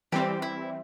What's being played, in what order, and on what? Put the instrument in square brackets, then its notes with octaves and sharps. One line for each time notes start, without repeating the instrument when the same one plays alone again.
[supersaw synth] E3 G3 C4 [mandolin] G4
[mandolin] E4